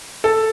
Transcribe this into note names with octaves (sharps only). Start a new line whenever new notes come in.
A4